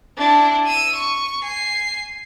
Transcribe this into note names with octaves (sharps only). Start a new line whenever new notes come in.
D4 E4
E6 D#7
C#6
G#5 C7